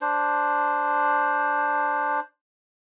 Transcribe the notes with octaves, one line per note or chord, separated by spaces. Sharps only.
D4 C5